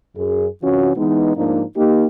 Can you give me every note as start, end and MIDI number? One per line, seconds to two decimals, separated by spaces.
0.16 0.46 42
0.16 0.46 68
0.63 0.92 48
0.63 0.92 52
0.63 0.92 61
0.63 0.92 65
0.63 0.92 66
0.97 1.34 52
0.97 1.34 56
0.97 1.34 59
0.97 1.34 63
1.36 1.63 44
1.36 1.63 53
1.36 1.63 58
1.36 1.63 62
1.36 1.63 63
1.76 2.06 58
1.76 2.06 63
1.76 2.06 67